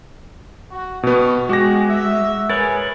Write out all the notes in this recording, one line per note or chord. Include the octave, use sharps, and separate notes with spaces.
F#4
B2 G3 B3 C#6
G#3 F#4 G5 G#5 D6 A#6
E5
G#4 A#4 B4 C#5 A6